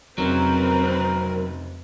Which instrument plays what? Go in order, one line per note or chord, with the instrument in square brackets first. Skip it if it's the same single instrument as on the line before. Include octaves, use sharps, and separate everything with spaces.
[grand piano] F1 C#3 [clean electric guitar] F#3 [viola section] C4 B4 [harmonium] A#4